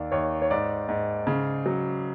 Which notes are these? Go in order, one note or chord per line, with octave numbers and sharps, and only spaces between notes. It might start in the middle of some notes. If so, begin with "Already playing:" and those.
Already playing: D#2 D5
D#2 C#5
C#5
G#2 D5
G#2
C#3
F#3